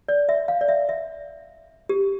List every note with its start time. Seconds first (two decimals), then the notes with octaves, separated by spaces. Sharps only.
0.08 D5
0.29 E5
0.48 F5
0.61 D5
0.68 E5
0.89 E5
1.89 G4